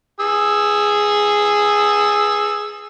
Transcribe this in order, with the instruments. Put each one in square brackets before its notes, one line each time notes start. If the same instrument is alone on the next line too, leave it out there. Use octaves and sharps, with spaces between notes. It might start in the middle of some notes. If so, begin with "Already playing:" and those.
[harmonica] G#4 E6